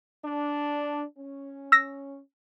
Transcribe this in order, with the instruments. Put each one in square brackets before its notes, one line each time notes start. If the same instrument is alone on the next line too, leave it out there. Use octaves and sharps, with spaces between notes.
[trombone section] D4
C#4
[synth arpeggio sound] E6 A#6